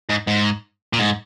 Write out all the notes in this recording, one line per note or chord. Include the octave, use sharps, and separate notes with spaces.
G#2
G#2
A#2
G#2